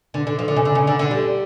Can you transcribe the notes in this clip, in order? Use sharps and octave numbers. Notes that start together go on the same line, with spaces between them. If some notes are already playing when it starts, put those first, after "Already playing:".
D3
D3
F3
D3
C#3
D3
C#3
D3
D3
G3